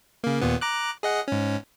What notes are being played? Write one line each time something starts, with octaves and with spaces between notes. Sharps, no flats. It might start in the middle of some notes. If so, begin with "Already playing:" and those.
C#3 A#3
D#2 A#2 B3
A#5 D6 F#6
G#4 D#5 F#5
G#2 C#4